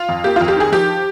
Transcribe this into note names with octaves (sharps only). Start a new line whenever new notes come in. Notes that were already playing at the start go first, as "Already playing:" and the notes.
Already playing: F4
F2
A#3 G4
F2 F4
G4
D#3 G#4
F3 G4